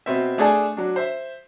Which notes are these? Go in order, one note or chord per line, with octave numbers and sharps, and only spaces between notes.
B2 C4 E5
A3 D4 G#4 D5 G#5 A5
F#3 D4
C5 E5